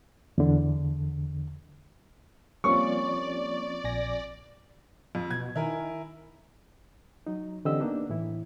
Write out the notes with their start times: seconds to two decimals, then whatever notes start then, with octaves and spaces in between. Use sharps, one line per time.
0.38 E2 D3
2.64 F3 G3 A#3 C4 C#4 F4 D5 C#6
3.84 A#1 G#5 A#6
5.15 F2
5.31 B2 G#6
5.56 D#3 E4 A#4 G#5
7.27 F#3 D#4
7.65 D3 E3 C4 G4 D#5 E6
7.80 A#3 B3 D4 D#4
8.10 A2 E3 E4